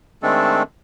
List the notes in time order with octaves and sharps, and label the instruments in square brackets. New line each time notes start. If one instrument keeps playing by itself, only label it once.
[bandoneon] D#3 G#3 A3 C4 D4 A4